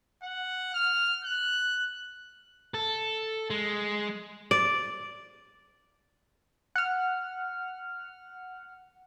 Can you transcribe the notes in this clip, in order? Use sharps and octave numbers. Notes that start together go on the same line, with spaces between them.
F#5
F6
F#6
A4
G#3
D5
F#5 F6